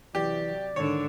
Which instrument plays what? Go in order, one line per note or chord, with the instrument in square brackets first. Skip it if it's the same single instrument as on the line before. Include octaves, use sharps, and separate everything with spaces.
[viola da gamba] C3 F#3 [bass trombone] E3 [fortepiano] G4 [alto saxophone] D5
[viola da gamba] G#2 D3 D4 [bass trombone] D#3 [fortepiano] C#5